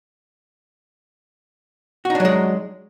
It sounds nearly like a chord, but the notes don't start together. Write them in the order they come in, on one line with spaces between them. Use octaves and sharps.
F#4 D#4 D4 F#3 G#3